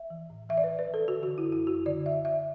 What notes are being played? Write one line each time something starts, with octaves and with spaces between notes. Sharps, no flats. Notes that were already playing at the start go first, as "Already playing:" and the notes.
Already playing: E5
E3
A2
E3 E5
D5
B4
E3
B4
E3
A4
D3 F#4
D3 F#4
E4
F#2
E4
F#2 F#4
D3 D5
D3 E5
D3 E5